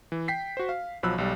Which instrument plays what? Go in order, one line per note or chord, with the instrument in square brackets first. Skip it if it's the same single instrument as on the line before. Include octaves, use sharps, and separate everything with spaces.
[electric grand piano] E3
G5 B6 C7
F#4 C5
F5
B1 F3 F#3 B5 E6 F#6
B1 G3